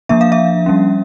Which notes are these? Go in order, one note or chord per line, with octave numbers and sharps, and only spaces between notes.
F3 A#3 D4 E5
F5
E5
G3 A#3 C#4